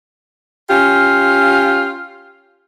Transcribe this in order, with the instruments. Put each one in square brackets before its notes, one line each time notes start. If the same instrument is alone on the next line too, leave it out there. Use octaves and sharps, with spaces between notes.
[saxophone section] C#4 F4 G4